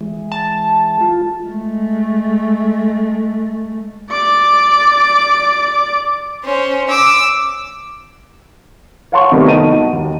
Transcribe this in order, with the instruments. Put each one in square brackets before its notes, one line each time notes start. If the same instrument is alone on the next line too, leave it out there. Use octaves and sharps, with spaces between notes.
[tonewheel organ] E3 G#3
[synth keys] A5
[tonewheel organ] F4
[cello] G#3 A3
[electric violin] D5 D6
[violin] C#4 C5
D6 E6
[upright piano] C#5 F5 F#5 A5 C6 C#6
C3 D#3 F#3 G3 A3 B3
D#4 D#5 A5 D#7
F#4
D#2